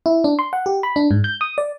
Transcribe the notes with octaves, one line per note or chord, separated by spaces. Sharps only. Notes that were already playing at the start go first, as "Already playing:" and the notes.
E4
D4
C6
F#5
G4
B5
D4
G#2
G6
D#6
D5